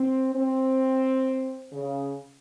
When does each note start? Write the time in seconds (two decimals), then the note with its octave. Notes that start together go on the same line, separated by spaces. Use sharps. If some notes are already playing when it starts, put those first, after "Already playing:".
Already playing: C4
0.34 C4
1.73 C#3